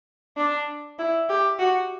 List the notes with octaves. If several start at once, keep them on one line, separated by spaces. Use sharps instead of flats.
D4
E4
G4
F#4